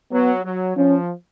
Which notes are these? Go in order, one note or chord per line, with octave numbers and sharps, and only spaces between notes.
F#3 B3
F#3
F3 C#4